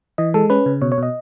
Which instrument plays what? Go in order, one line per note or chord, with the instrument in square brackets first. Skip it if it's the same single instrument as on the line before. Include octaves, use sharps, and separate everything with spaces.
[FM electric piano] E3 D#5
G#3 A4
C#4 B4
C#3
B2 C#5
C#5
B2 D#5